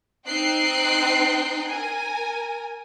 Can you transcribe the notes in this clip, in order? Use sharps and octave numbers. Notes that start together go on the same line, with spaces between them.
C4 D#4 G5 F#6 C7 D7
A#4 G#5